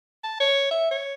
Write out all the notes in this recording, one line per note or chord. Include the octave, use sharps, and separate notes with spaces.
A5
C#5
E5
C#5